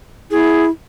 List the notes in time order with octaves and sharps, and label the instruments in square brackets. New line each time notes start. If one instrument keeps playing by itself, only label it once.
[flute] E4 [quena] G#4